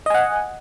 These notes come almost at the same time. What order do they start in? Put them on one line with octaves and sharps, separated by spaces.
D#5 G#5 F#5